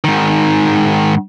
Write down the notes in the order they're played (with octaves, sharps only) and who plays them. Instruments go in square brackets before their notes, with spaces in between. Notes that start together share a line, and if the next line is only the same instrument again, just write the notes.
[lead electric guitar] G#2 D#3